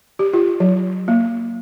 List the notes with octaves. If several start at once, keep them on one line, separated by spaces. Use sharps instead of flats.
G4
F4
F#3
A#3